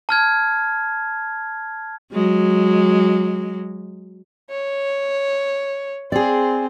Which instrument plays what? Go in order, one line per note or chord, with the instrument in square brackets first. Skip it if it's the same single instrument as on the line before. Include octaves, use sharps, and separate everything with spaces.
[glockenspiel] A5 F6 G#6
[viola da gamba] F#3 G#3
[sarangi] C#5
[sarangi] C4 [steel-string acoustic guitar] G#4 D5